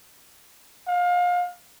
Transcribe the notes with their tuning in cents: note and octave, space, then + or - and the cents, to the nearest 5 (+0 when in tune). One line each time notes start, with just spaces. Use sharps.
F5 +30